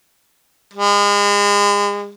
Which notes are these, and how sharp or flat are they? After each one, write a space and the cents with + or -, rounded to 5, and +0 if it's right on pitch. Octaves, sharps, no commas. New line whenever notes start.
G#3 -35